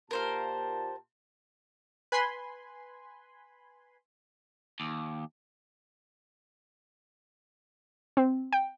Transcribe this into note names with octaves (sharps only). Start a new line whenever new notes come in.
A#2 G4 A#4 C5 F5 A5
B4 G#5 B5 C6
D#2
C4
G5